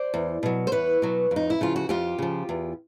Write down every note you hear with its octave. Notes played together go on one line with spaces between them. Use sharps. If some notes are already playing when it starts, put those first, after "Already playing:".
Already playing: C5 D5
E2
B2 F#3
C5
E2 B4 C#5
B2 F#3
F2
D#4
E4
C#3 F3 F4
F#4
F2 F4 G4
C#3 F3
E2